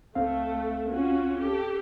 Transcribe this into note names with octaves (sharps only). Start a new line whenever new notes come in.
C#2 A3 C4 F5
C#4 F4 F#4
G4 A4